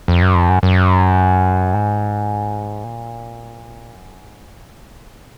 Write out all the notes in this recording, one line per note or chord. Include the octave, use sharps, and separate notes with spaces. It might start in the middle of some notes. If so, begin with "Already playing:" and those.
F2
F#2
F2
F#2
F#2
G#2
A#2
F#2
G#2
A#2